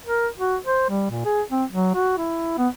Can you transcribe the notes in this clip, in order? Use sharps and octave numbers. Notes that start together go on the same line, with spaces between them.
A#4
F#4
C5
G3
A#2
G#4
C4
F#3
F#4
E4
B3